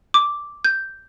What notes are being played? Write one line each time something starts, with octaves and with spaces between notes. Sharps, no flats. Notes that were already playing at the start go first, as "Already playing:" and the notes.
D6
G6